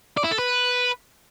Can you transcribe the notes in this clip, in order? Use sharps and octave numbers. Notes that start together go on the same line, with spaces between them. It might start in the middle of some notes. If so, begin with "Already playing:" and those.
D5
E4
A4
B4